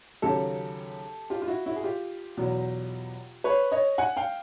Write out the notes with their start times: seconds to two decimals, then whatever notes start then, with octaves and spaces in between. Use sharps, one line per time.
0.22 D#2 C#3 F#3 G4 A4
1.30 F4 G4
1.42 F4
1.48 E4 F#4
1.66 E4 F#4
1.76 G#4
1.83 F4 G4
2.37 E2 B2 F#3
3.44 B4 C#5
3.72 C#5 D#5
3.98 F#5 G#5
4.17 F5 G5